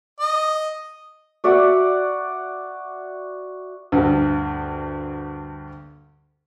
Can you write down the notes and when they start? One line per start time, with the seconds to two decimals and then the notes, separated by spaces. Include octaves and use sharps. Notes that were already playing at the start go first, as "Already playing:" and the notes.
0.20 D#5
1.44 F#4 D5 E5 F#5
3.92 D2 G2